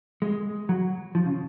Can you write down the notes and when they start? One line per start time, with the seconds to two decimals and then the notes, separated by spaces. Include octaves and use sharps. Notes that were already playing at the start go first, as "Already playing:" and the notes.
0.22 G#3
0.69 F#3
1.15 F3
1.26 C#3